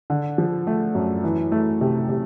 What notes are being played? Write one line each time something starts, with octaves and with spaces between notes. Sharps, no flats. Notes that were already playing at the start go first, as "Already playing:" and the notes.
D3
F3
A3
F#2
E3
A3
C3
C3